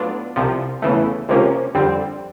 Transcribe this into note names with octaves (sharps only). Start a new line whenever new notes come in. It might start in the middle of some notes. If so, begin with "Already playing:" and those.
Already playing: A2 F#3 B3 D4 F4
C2 C3 F3
E2 C#3 E3 A3
C#2 C3 F3 A#3 C#4
F2 D3 G3 C4